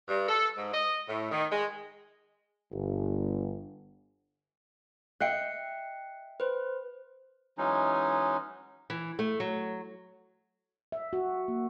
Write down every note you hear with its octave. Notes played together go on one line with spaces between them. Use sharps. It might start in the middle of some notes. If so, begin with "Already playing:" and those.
G2
A4
G#2
D#5
A2
D#3
G#3
G1
D#5 E5 G5 F#6 C7 C#7
B4 C5
E3 F#3 G#3 C#4 D#4
E3
A3
F#3
E5
F#4
A#3